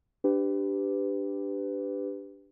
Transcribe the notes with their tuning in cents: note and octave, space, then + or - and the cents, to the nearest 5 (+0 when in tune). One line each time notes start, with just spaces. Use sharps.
D4 +0 G4 +0 B4 +25